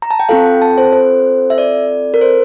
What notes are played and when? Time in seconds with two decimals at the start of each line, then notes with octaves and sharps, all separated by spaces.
0.02 A#5
0.11 A5
0.20 G5
0.29 C4 F4 A4 F5
0.46 G5
0.62 A5
0.78 C5
0.93 C5
1.50 E5
1.58 D5
2.14 A#4
2.21 C5